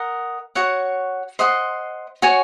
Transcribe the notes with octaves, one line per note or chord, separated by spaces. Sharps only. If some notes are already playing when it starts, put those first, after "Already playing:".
Already playing: A#4 D#5 F#5
F#4 C#5 F#5
C5 D#5 F#5 C6
F#4 C#5 G#5